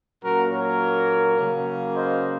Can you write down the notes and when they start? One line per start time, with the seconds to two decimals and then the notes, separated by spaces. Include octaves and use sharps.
0.23 A#2 F#3 A#3 C#4 F#4 A#4
0.52 A#4 C#5
1.37 C#3 F#3 A#3 C#4
1.96 C5 D#5